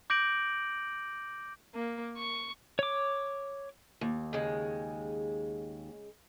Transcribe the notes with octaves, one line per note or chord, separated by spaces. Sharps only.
D6 G6 A#6 D7 F#7
A#3
C#6
C#5 D6
D#2
C#3 G#3